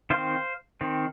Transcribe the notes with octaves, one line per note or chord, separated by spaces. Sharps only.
D#3 C4 C5 F5
D#3 C4